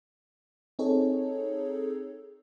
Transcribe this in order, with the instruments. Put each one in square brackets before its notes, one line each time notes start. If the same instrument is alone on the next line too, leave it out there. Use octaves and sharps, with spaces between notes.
[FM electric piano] C4 D#4 G#4 A4 C#5